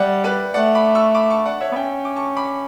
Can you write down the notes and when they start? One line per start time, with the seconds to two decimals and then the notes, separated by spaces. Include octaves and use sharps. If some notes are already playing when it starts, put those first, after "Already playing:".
Already playing: G3 D5 E5 F#5 G5
0.24 B4 D5
0.54 A3 D5 F#5
0.75 B5 D6
0.95 C#6 E6
1.15 B5 D6
1.30 A5 C#6
1.46 D5 F#5
1.61 C#5 E5
1.72 B3
1.76 C#4 E5 G5
2.05 D6
2.16 A5 C#6
2.37 B5 D6